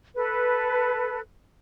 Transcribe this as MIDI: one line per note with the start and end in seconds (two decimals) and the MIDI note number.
0.16 1.19 69
0.16 1.19 71